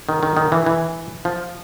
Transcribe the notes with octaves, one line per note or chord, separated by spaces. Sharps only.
D#3
D#3
D#3
E3
E3
F3